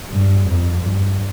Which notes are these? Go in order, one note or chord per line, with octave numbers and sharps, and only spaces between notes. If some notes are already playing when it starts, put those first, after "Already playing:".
G2
F2
G2